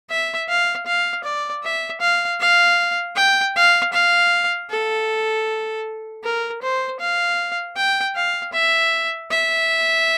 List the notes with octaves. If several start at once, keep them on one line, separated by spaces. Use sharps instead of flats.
E5
F5
F5
D5
E5
F5
F5
G5
F5
F5
A4
A#4
C5
F5
G5
F5
E5
E5